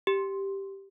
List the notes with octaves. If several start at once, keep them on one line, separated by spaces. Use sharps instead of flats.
G4